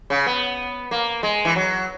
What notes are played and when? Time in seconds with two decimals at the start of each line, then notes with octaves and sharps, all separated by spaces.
0.10 C#3
0.26 B3
0.91 A#3
1.23 G#3
1.45 E3
1.56 F#3